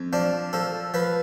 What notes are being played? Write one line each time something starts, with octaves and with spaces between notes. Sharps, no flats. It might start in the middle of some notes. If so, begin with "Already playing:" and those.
Already playing: F2
F3 D4
F3 A4
F3 B4